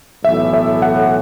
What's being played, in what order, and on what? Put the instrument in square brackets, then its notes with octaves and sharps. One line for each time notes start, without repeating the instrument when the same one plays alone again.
[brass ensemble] B1 A2 E3 [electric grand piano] E5
[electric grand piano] E5
F#5